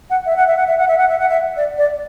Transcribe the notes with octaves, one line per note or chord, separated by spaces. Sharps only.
F#5
E5
F#5
E5
F#5
E5
F#5
E5
F#5
E5
F#5
E5
D5
D5